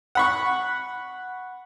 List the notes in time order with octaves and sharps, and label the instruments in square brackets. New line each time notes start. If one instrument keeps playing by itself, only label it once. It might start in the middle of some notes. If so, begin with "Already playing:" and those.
[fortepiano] F#5 B5 C#6